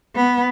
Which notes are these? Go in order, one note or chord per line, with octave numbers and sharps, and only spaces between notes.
B3